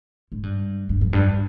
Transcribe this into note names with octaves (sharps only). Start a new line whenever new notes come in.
G#2
G2
G2
F2
G2